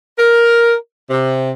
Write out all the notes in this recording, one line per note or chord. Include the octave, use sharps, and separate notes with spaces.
A#4
C3